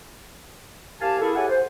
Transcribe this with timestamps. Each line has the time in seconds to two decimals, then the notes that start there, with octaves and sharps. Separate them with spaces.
1.01 C2 G4 F5 G#5 A5
1.21 A#3 E4 G#4 A4
1.36 E4 G4 A4 C#5 F#5 G#5
1.49 C5